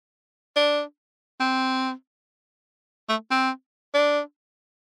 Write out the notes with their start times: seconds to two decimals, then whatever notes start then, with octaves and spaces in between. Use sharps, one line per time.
0.56 D4
1.40 C4
3.09 A3
3.31 C4
3.94 D4